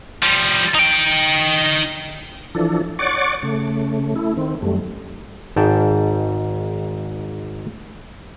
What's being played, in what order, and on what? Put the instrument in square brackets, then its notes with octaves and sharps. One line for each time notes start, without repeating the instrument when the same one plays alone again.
[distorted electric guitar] F3 G3
D#4 G5
[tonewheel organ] E3 F3 D4 A4
C#5 D5 F#5 C#6 D6 A6
C#3 A3
A3 E4
D#3 C4
F#2 G3 A3
[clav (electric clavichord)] G#1 G#2 G5 A5